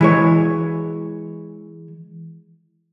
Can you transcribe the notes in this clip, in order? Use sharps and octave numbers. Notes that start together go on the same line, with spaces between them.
E3 G#3 C#5